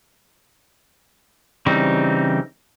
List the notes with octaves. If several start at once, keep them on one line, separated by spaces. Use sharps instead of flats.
C#3 E3 G3 C4 D#4